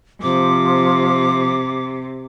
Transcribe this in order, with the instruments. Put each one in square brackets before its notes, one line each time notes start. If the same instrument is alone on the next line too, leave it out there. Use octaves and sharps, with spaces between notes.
[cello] C3 [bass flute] F3 [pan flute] D6